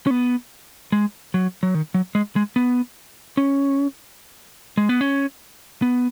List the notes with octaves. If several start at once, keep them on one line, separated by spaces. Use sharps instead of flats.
C#4
B3
G#3
F#3
F#3
D#3
F#3
G#3
G#3
B3
C#4
G#3
B3
C#4
B3